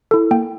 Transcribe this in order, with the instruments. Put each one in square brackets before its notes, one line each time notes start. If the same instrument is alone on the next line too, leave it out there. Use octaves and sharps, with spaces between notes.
[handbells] E4 A4
A#3 G5